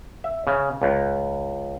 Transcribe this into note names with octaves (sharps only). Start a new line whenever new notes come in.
E5
C#3
C#2